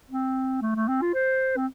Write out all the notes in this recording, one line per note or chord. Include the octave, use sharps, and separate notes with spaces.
C4
A3
A3
C4
F4
C5
C4